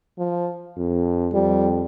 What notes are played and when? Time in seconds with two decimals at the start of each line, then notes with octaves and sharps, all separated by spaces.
0.19 F3
0.77 F2
1.33 F2 G3